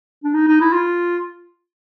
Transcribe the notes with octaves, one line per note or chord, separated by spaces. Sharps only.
D4
D#4
D#4
E4
F4